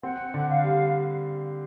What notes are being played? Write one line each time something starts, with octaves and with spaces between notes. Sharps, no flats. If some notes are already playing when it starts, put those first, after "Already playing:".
C4 F#5
D3
F5
G3